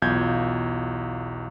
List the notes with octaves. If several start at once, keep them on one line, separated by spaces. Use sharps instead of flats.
B1 E2 F4 G6 G#6